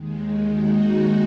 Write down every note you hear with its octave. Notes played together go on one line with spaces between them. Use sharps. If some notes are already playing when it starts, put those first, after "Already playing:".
Already playing: D#2 D#3 G#3
D#2 D#3 G#3 D#4 F#4